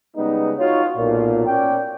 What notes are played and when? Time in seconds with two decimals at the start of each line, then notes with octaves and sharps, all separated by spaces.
0.16 C#3 G3 G#3 B3 D#4
0.59 D#4 F4 F#4 C#5
0.98 B1 A#2
1.47 C#4 A#4 D5 G5